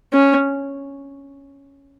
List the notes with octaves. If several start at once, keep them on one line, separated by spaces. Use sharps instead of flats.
C#4